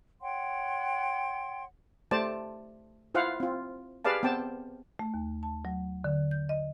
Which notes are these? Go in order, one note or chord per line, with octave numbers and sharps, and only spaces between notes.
C#5 F#5 G5 C6
A3 G4 C5 D5 A5
E4 F4 C5 F5 F#5
C4 F4
G4 G#4 B4 D5 F5 A5
B3 C4 G5 A5
A3
D#2
A5
F#3
D3
G6
D#5